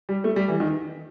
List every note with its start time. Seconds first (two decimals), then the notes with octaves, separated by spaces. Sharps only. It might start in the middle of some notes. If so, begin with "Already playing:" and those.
0.09 G3
0.24 A3
0.36 G3
0.48 E3
0.60 D#3